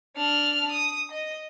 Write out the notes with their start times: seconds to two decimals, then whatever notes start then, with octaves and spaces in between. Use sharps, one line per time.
0.16 D4 F6
0.71 D#6
1.11 D#5